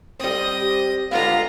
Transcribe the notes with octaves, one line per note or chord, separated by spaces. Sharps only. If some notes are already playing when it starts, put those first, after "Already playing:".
G3 C4 D#5 D#6
G4
D3 G#3 B3 F4 F5 A#5